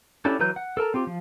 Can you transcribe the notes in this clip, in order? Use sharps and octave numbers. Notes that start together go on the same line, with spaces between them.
C#4 D4 E4 G4 A4
E3 F#3 B4 A#5 G6
F#5
A4 A#4 A5 A#5
C4 F4 G4
F3